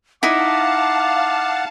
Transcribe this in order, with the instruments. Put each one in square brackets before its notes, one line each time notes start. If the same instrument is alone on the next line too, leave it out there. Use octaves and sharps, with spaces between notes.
[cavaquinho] D#4 E4 [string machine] F5 A5 [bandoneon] F#5 [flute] D6